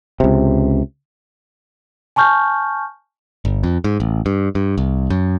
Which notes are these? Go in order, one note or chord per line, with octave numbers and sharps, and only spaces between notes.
C#2 C3
G#5 A5 C#6 F6 G6
G1
F2
G#2
A1
G2
G2
C2
F#2